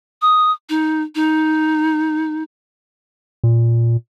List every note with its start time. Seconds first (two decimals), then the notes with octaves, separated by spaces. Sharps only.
0.22 D#6
0.69 D#4
1.15 D#4
3.44 A#2